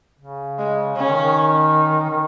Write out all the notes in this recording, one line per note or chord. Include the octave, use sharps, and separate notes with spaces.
C#3
G#3
C#3 C#4
D#3
D#3
D#3